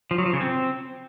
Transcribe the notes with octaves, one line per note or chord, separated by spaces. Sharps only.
F3
F#3
F3
C#3
C4